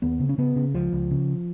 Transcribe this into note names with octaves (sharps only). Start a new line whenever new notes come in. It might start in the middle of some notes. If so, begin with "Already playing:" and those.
D#2 B3
C#3
C#4
C#3 B3
C#3
C#2 F3
C#2
C#3